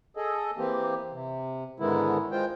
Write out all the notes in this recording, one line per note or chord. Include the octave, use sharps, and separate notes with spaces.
G#4 A4 D#5
E3 A#3 C4 G4
C3
G#2 D3 D#3 G#3 B3 E4
G#3 F4 C5 G5